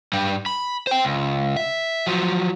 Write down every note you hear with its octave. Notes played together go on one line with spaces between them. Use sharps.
G2 G3
B5
C5 G5
C#2
E5
F3 F#3